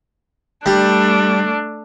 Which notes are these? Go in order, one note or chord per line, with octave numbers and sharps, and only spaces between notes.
G3 A3 D4